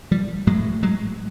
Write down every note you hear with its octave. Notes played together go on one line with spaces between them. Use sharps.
F3 G3
A2 F#3 G#3
F#3 G#3